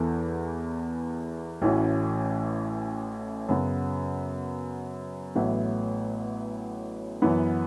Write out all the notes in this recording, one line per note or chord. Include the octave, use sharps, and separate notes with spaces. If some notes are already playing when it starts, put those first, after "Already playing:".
Already playing: E2 E3 B3 A4
A1 A2 E3 C#4 F#4
F#2 C#3 F#3 B3
A1 A2 F#3 B3 E4
F#2 E3 B3